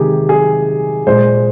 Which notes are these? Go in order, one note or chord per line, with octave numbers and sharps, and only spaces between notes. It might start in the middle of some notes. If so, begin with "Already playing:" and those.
Already playing: C3 D#3 G#3 G4 G#4
G#4
A#2 G#3 C5